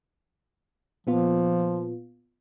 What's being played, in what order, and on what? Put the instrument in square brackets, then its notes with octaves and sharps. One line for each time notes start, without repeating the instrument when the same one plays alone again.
[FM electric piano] A#2 B3 F4 [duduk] F3